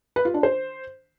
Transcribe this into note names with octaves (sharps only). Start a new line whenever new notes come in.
B4
F4
D4
C5